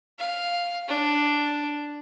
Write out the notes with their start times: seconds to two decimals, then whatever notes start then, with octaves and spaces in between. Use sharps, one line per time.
0.19 F5
0.88 D4